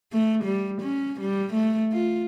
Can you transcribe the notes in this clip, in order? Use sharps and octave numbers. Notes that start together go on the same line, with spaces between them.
A3
G3
C#4
G3
A3
F4